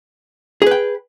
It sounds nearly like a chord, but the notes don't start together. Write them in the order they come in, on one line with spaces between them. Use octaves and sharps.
G#4 B4 G5